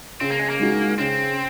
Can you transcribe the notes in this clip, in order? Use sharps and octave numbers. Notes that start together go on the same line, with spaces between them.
C#3 C4
A#3
G#3
A#3
G#3 D#4 F#4
C#3 C4